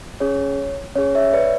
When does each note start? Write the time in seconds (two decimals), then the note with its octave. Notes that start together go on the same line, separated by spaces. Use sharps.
0.20 C#4 G#4 C#5
0.95 C#4 G#4 C#5
1.15 C#5 E5
1.33 B4 D5